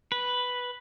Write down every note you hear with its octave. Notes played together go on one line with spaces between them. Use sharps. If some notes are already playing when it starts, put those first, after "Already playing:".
B4